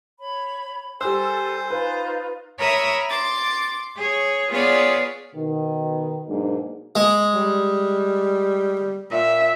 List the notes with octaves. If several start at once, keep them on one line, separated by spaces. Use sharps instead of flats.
C#5 B5
G3 A4 A#4 C5 G#5 E6
D#4 F4 B4
A#4 C#5 E5 B5 D#6 E6
C6 D6 A6
G#4 C#5
B3 F4 G#4 C#5 D5
B2 D#3
G#2 B2 F#3 A#3 D4
G#3
G3
A#2 E5